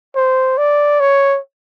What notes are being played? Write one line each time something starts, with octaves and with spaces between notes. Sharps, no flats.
C5
D5
C#5